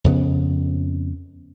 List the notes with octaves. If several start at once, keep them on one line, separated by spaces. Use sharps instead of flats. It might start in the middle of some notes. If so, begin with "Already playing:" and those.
F2 C#3 B3